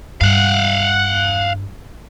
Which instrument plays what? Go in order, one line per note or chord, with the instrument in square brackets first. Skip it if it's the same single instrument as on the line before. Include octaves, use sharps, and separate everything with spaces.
[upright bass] G2 [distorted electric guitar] F5 F#5